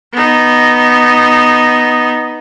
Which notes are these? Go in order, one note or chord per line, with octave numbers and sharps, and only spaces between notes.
B3 D#4